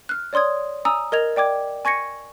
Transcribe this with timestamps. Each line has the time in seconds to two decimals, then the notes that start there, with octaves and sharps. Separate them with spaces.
0.09 F6 F#6
0.33 C#5 D5 C6 D#6 G#6
0.85 G#5 A#5 D#6 E6
1.12 A#4 D#5 G#6 F7
1.36 D5 G5 D6 G#6
1.85 G#5 C#6 G#6 A#6 C#7